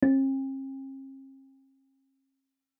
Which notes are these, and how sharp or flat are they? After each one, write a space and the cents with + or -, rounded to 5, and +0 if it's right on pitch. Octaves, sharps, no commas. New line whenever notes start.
C4 +45